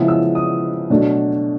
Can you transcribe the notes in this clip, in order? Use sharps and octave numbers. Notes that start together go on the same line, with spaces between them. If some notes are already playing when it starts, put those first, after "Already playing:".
Already playing: C#3 F3 G#3 B3 E4
E6
D#6
B2 F#3 A3 D4